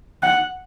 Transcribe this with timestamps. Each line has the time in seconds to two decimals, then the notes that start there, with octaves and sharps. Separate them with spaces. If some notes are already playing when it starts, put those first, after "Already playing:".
0.22 F#5